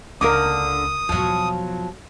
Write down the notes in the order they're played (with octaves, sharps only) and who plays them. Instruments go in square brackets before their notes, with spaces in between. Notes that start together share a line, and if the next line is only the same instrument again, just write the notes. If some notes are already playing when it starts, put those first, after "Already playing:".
[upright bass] C#2 [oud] D3 A#3 D4 [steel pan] A#4 D6 [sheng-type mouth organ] D#6
[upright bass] E2 B2 [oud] F3 F#3